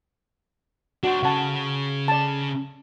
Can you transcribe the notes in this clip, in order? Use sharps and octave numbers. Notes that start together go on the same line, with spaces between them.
D4 F#4 C5
C#3 C#5 F#5 A5
D5 A5